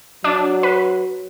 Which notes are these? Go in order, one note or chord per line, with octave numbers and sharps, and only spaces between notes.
F#3 D4
B4